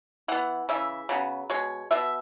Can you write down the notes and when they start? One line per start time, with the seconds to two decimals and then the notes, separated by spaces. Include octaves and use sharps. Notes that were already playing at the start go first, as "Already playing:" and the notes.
0.28 E3 B3 F#5
0.69 C#3 E3 E5
1.09 C#3 F#3 B3
1.50 B2 G#3 C#5
1.91 B2 B3 E5